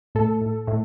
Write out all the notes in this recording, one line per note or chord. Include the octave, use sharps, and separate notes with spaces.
A2 A4
A2
A2